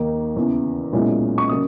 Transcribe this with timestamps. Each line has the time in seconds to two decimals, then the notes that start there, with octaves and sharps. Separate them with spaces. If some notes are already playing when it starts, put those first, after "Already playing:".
Already playing: D#2 D#3 A#3 D#4
0.36 E2 C#3 E3
0.93 B1 A#2 G#3 C#4 E4
1.38 C#6
1.49 C#3 F#3 A#3 D#6